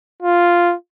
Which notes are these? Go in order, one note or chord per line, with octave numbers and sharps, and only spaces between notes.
F4